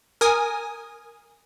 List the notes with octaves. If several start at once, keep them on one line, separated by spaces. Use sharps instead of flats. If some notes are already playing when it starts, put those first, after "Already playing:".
A#4 G#5 D#6